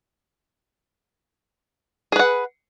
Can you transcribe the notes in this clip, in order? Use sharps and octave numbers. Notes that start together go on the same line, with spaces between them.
G#4 B4 F#5